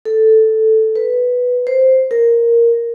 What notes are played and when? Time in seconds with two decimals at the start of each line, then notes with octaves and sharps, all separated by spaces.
0.05 A4
0.96 B4
1.67 C5
2.11 A#4